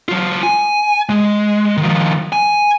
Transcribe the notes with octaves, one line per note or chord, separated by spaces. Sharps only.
F#3 F4
G#5
G#3
D#3 F3
G#5